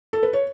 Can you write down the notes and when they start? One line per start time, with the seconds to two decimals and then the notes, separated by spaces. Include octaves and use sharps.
0.13 A4
0.23 B4
0.33 C#5